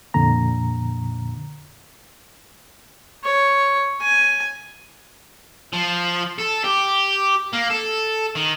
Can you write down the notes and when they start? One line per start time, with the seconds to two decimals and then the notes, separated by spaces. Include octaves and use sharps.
0.14 F2 A#2 D3 A#5
3.24 C#5
4.02 G#5
5.73 F3
6.38 A4
6.64 G4
7.53 A#3
7.70 A4
8.35 D#3